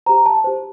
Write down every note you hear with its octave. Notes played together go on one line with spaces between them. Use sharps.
G4 C5 A#5
A5
G4 C5